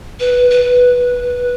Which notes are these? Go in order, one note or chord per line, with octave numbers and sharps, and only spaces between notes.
B4
B4